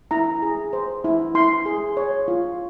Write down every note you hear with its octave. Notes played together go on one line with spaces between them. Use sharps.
E4 A#5
G#4
C5
E4
E4 C6
G#4
C#5
F4